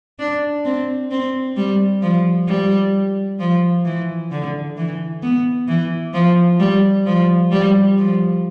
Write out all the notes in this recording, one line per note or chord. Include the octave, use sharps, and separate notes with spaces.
D4
C4
C4
G3
F3
G3
F3
E3
D3
E3
B3
E3
F3
G3
F3
G3
F3